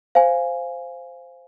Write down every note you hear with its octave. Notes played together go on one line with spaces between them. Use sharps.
C5 F5 G#5